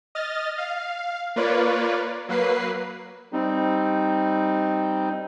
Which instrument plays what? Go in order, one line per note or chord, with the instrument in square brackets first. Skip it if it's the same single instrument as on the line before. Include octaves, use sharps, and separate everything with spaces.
[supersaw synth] D#5 F6 A6
F5
A#3 F4 B4 C#5 D5
F#3 A#3 B4 C7
[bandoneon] G3 C4 D#4